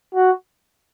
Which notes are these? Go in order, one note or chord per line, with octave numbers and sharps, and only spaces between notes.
F#4